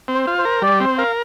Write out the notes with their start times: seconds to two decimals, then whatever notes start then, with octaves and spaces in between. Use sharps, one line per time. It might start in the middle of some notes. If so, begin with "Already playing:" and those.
0.08 C4
0.15 C5
0.27 F4
0.38 C5
0.45 A#4
0.62 G3 D5
0.80 C4 C5
0.98 A#4 F5